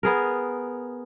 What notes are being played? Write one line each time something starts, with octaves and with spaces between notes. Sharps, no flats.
B3 G#4 A#4